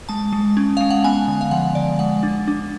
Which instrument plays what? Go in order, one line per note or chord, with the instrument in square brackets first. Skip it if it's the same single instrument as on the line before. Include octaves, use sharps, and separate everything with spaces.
[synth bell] G#3 A5
G#3
C#4
G#3 F5
F#5
B3 G#5
D3
F5
F3 F#5
D3 D5
G#3 F#5
D4
D4